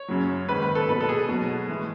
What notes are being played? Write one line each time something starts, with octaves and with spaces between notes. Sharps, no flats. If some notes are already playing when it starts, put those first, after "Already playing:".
Already playing: C#5
F#2 C#3 F#3
G#2 D#3 G#3 B4
B4
A4
B2 G#3 B4
A4
G#4
B2 F#3
A2 E3 G#3